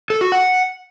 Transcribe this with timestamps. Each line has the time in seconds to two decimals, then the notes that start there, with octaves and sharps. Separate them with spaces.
0.10 A4
0.21 F#4
0.32 F#5